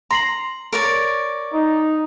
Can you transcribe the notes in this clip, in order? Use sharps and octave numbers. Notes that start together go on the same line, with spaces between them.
A#5 C6 C7 F#7
A#4 C#5 D5
D#4